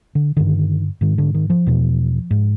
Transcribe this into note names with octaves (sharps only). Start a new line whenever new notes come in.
D3
G2 D3 D#3
G#2 D#3
D3
D#3
F3
E2 B2
G#2